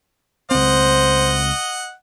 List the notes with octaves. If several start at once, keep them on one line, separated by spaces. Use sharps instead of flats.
C#2 C4 C5 D#5 F#5